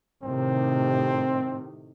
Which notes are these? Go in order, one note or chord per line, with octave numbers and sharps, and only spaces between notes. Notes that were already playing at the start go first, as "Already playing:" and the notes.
A2 C3 D#3 C4